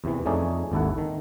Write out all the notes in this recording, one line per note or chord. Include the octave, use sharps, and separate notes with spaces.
E2 C3 E3
F2 A3 C#4 D#4 G#4 D5
G#1 D#2 E4 A4 F#5
D#3